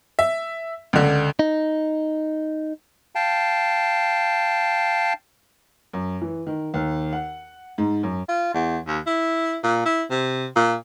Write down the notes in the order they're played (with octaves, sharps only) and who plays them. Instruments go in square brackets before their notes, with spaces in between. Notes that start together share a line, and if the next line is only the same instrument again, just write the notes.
[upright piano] E5
C#2 D3
[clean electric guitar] D#4
[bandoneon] F5 G5 A5
[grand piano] F#2
E3
D#3
D#2
F#5
G#2
F#2
[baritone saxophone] F4
E2
D#2
E4
A#2
E4
C3
A#2